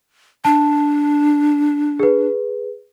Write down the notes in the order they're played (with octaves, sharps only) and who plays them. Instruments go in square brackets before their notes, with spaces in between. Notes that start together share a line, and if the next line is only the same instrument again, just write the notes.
[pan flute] D4 [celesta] A5
[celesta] G#4 B4